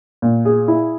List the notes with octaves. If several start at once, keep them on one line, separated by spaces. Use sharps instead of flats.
A#2
G#4
E4